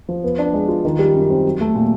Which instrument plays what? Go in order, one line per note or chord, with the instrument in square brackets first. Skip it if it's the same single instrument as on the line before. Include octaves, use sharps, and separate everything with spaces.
[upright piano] F3
B3
D4
G#3
F4
D#3
G3
F#2
C4
F#3
A3
A#2